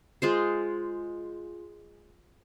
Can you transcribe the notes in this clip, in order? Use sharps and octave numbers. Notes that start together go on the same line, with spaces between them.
G#3 F4 C5